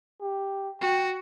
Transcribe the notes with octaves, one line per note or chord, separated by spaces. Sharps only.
G4
F#4 G5